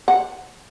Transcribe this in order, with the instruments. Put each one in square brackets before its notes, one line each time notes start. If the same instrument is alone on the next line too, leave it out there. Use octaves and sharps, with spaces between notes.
[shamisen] F#5